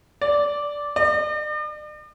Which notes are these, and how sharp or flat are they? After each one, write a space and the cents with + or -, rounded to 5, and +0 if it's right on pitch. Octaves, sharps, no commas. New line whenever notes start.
D5 -10
D5 +45